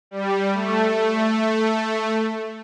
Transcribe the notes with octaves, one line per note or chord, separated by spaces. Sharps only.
G3
A3